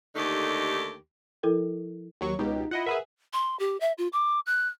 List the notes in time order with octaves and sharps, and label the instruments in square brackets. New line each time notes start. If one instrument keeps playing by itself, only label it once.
[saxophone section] D#2 D3 A3 D#4 G4
[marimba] F3 E4 A4 A#4 G5
[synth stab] D#2 F#3 C#6
[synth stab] C#2 B2 G4 [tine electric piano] D#4
[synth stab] E4 D#5 F#5 [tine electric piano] F4
[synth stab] G#4 B4 E5 [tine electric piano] A#4 F#5 B6
[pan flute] C6
G4
E5
F4
D6
F#6